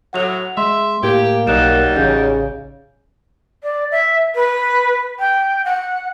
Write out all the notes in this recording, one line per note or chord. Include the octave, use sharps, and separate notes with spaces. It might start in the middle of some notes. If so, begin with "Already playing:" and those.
A2 F#3 F#5 F7
G#3 E5 C6
A2 A#3 G4 G#6
B1 F#3 G3 D#4 A#4 F#6 E7
A1 C#3 G6
D5
E5
B4
G5
F#5